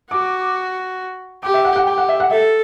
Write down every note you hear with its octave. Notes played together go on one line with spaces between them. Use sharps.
F#4 D6
G4 D6
E5
F#5
F#5
G4 G5
F#5
E5
F#5
A4 E5